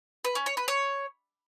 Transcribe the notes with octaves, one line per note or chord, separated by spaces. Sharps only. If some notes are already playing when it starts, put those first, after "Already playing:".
B4
C#4
C#5
B4
C#5